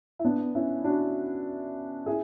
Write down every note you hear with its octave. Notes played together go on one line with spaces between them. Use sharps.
E4
B3 D4
C#4 E4
D4 F#4
E4 G#4